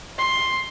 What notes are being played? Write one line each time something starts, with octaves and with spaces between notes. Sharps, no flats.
C6